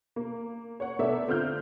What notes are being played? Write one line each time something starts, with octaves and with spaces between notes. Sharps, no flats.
A#3
C#5 F#5
A3 B3 A4 A#4 D5 E5
D3 C4 F4 F6 G6